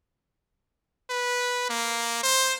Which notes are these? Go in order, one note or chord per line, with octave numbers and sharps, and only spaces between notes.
B4
A#3
C5